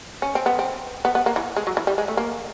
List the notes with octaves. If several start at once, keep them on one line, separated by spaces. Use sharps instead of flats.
C#4
C4
B3
C4
B3
B3
A#3
E3
G#3
F#3
E3
G3
G#3
A3
A#3